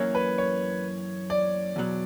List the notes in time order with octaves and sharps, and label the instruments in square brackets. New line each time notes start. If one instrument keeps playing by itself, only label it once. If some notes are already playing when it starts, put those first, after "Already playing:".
Already playing: [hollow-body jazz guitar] F#2 E3 A#3 C#4 [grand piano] C#5
[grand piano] B4
C#5
D5
[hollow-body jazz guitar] E2 B2 F#3